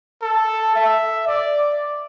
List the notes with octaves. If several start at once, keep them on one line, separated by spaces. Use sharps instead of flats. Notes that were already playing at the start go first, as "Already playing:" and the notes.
A4
E5
D5